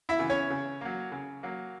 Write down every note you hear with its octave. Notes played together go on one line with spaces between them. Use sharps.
E4 E5
C#3 E3 B3
C#4 C#5
C#3
F#3 A#3
C#3
F#3 A#3